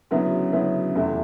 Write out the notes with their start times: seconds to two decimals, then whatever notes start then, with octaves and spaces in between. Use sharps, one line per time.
0.11 D2 C#3 F#3 B3 E4
0.53 D2 C#3 F#3 B3 E4
0.95 F1 E2 C3 E3 A3